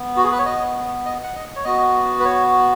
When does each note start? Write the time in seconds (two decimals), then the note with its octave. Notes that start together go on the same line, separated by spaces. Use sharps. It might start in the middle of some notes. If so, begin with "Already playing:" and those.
Already playing: B3
0.17 F#4
0.23 G#4
0.31 B4
0.39 C#5
0.46 D#5
1.05 D#5
1.23 F#5
1.36 D#5
1.56 C#5
1.64 B3 F#4 D#5
2.20 B4
2.25 C#5